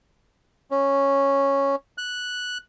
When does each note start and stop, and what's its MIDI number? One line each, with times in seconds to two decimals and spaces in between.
0.71 1.76 61
1.98 2.58 90